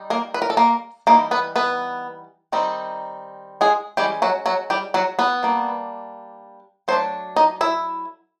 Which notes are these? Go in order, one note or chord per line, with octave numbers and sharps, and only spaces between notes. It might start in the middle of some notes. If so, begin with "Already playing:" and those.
Already playing: G3 D#4
A#3 A#4
B4
A#4
A4
A#3 A#4
E3 G3 A#3 D#4 A#4
B3 B4
B3 B4
D#3 G3 C4 D#4
G#3 G#4
E3 G3 G#3 C#4 G4
F#3 F#4
F#3 F#4
G3 G4
F#3 F#4
B3 B4
G3 A#3 D4
F#3 A3 D4 C5
D#4 D#5
E4 E5